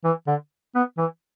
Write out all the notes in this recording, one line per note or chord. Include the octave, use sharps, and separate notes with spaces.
E3
D3
B3
E3